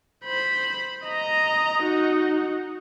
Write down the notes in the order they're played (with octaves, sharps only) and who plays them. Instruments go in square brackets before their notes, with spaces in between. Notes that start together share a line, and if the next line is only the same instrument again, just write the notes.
[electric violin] C5 B5
D#5 A#5
D#4 F#4